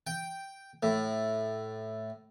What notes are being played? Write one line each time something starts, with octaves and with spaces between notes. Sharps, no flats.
G5
A2